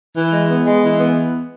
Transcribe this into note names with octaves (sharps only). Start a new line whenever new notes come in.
E3
G#3
B3
G#3
E3
B3